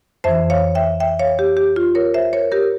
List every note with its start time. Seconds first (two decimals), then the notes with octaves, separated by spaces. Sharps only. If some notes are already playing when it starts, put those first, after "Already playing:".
0.24 F2 E3 C5 E5
0.50 C#5 F5
0.75 E5 G5
1.00 E5 G5
1.19 C#5 F5
1.39 G4
1.57 G4
1.76 F4
1.95 A#4 C#5
2.14 C5 E5
2.33 A#4 C#5
2.52 G4 A#4